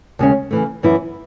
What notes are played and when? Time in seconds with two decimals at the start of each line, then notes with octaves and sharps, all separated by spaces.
0.19 D#2 C#3 G#3 C#4
0.51 C#3 E3 A3
0.83 F#2 E3 B3 E4